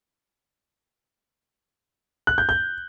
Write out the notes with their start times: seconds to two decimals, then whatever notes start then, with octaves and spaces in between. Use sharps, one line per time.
2.27 F#6
2.38 G6
2.49 G6